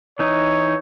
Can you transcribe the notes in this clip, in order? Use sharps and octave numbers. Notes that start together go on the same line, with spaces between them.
E3 D#4 C#5